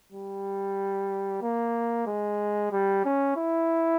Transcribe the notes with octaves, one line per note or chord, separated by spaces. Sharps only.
G3
A#3
G#3
G3
C#4
E4